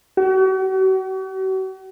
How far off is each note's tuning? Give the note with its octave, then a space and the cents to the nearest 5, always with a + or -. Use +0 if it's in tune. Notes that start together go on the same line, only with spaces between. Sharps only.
F#4 +45